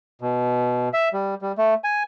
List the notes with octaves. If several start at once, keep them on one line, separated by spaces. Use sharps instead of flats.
B2
E5
G3
G3
A3
G#5